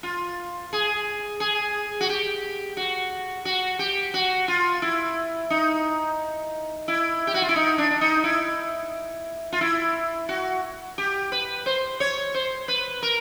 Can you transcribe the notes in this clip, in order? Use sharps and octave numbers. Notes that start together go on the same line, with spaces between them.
F4
G#4
G#4
F#4
G4
F#4
F#4
G4
F#4
F4
E4
D#4
E4
G4
F#4
F4
E4
D#4
D4
D4
D#4
E4
F4
E4
F#4
G4
B4
C5
C#5
C5
B4
A#4